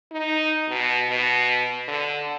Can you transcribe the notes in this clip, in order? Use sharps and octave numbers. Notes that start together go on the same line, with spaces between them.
D#4
B2
B2
D3